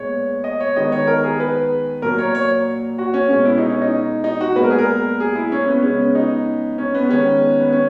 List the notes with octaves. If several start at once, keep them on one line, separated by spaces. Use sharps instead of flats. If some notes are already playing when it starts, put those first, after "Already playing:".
Already playing: A#2 G#3 B3 C#5
D#5
C#5
D#3 G#3 B3 D#5
C#5
A#4
G#4
B4
A#2 F#3 A#3 A#4
C#5
C#5
F#4
C#4
B2 G#3 B3 C#4
E4
D#4
C#4
D#4
D#4
F#4
A#2 G#3 B3 B4
A#4
G#4
A#4
G#4
E4
C#4
B3
C#3 G#3 B3 C#4
D#4
C#4
B3
D#3 G#3 B3 C#4
B3
C#4